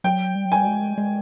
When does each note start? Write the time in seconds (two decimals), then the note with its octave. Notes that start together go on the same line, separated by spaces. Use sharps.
0.04 F#3 G5
0.35 G3
0.45 F#3
0.52 G3 G#5
0.66 G#3
0.98 G#3